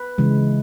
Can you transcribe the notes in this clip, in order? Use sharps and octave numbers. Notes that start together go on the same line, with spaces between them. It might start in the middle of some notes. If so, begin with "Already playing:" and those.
Already playing: B4
C#3 E3 G#3